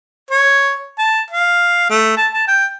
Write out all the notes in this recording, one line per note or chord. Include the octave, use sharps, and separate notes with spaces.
C#5
A5
F5
A3
A5
A5
G5